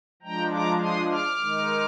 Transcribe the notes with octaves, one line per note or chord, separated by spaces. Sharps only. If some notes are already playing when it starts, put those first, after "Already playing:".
F3 G#3 D4 G5 A#5
A#5 D6
C6 D#6
D6 F6
D#3 G#3 D#4